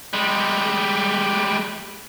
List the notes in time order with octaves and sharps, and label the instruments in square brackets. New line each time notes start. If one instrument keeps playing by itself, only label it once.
[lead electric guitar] G3 G#3